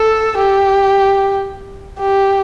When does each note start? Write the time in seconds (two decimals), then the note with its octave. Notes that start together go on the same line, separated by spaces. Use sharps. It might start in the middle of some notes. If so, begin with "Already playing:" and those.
Already playing: A4
0.37 G4
1.99 G4